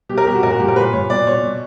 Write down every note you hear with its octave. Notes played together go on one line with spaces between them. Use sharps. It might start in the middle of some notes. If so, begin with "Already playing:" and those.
B2 G4
A#4
B2 G4
F#4
A#2 A#4
F#4
A#2 G4
A#4
A#2 B4
A#2 C#5
B2 D5
B2 C#5
B2